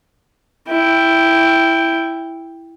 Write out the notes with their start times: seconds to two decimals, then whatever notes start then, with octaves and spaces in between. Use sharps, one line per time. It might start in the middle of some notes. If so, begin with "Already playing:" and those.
0.68 E4 G5